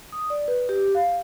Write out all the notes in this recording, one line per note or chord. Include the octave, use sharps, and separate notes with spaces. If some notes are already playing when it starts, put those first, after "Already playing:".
D#6
D5
B4
G4
F5